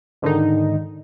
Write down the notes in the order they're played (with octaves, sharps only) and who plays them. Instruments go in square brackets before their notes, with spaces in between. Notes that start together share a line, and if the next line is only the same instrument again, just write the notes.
[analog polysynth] G#2 D3 D#3 D#4